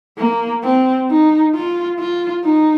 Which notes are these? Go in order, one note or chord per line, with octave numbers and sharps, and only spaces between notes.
A#3
C4
D#4
F4
F4
D#4